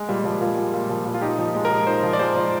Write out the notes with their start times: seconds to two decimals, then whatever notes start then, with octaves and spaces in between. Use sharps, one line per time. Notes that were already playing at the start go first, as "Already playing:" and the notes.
Already playing: G#3
0.08 A#2 G3
0.24 F3 G3
0.41 A#2 F4
0.56 G#3
0.74 A#2
0.89 F3
1.06 A#2
1.14 F4
1.21 D#4 G4
1.38 F3
1.54 G#3
1.65 A#4
1.71 F3
1.87 D#4 C5
2.03 F3
2.13 D5
2.19 G#3 C5
2.36 F3